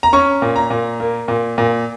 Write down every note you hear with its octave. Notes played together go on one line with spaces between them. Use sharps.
A#5
C#4 C#6
A#2
A#5
A#2
A#3
A#2
A#2